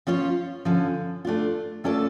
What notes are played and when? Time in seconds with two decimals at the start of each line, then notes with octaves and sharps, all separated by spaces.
0.07 F3 C#4 F4 C#5
0.65 D3 F3 C#4
1.25 A3 D4 F4
1.84 A3 C#4 F4 A4 D5